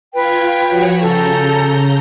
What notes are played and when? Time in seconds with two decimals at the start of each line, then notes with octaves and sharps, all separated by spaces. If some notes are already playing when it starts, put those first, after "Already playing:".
0.14 F4 B4 G5 G#6
0.67 F3 F#4 C#5
1.02 C#3 C#4 A4 A#5 G6